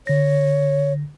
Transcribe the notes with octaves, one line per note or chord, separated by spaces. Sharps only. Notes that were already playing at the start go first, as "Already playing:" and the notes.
D3 C#5 A#6